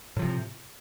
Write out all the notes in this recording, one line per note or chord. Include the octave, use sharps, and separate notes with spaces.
A2 C3 F3